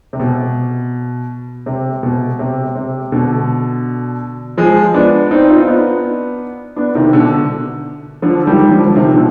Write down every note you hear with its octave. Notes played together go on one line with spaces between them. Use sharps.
C3
B2
C3
B2
C3
C3
B2 D3
F3 G#3
B3 D4
C4 D#4
F4
D#4
B3 D4
B3 D4
C3 D#3
B2 D3
D3 F3
D#3 G3
G3
D3 F3
F3
C3 D#3
B2 D3